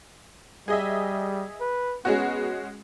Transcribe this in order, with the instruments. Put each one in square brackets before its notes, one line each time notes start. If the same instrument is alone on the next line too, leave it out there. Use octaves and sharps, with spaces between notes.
[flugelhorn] G3 [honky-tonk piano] G#4 D#5 E5
[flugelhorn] B4
[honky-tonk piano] G#3 C#4 F#4 [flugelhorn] B3